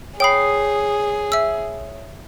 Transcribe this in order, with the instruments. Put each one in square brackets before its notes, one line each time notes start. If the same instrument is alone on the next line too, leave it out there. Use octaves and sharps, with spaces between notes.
[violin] G#4 [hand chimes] C#5 D#6 C7 [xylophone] G5 B5
[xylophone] E5 E6